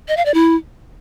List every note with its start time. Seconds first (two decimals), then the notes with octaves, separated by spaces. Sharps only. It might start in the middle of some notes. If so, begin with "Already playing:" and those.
0.08 D#5
0.17 F5
0.25 D5
0.34 E4